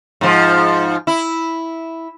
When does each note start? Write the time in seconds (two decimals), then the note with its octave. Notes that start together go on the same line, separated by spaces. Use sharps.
0.21 G#2 F3
1.07 E4